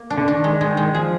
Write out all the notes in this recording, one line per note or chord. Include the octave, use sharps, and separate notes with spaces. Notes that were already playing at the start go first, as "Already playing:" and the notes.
Already playing: A#3
D4
D3
D#3 D4
G#3
D#3 G#3
G#3
F3 G#4